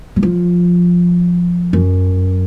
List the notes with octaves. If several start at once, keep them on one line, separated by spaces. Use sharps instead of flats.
F#3
F3
F#2